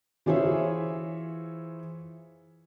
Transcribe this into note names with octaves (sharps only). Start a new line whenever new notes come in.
E3 F4 G#4 C5 C#5 E5